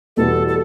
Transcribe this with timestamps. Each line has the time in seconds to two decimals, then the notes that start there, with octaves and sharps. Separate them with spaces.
0.17 E2 B2 G3 B3 E4 A4
0.48 A4